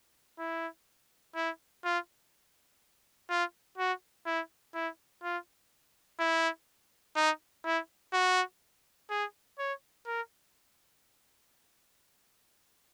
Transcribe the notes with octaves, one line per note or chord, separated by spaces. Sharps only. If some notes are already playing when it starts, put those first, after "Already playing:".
E4
E4
F4
F4
F#4
E4
E4
F4
E4
D#4
E4
F#4
G#4
C#5
A#4